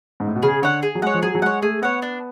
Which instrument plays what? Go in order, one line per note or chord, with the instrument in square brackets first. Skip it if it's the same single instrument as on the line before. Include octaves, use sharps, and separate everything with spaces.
[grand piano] G#2
A2
B2
[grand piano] C#3 [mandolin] G#4
[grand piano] D3 [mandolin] C#5 F#5
[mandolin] G#4
[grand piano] F#3
[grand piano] G#3 [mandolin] C#5 F#5
[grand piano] F3
[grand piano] F#3 [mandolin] G#4
[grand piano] F#3
[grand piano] G#3 [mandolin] C#5 F#5
[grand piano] A3 [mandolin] G#4
[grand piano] B3 [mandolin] C#5 F#5
[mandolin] D4